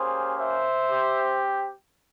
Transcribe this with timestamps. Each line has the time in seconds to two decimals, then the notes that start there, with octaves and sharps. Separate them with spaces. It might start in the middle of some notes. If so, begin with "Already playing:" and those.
Already playing: A#3 C#4 G4 G#4 C5
0.36 C5 E5
0.89 C4 G4